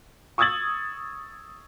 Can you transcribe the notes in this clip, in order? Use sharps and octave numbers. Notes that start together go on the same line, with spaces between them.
C#6 D#6 E6 G#6 A6 F#7